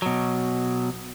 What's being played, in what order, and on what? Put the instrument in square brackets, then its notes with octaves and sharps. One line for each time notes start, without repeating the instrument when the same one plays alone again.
[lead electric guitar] B2 F#3